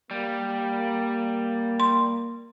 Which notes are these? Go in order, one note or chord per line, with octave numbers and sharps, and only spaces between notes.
G3 A#3
C6